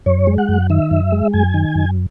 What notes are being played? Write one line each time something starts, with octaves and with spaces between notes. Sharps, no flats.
F#2 C#5
G#3
F#5
F#2
D#3 E5
F#2
G#3
F#2 G#5
D#3
F#2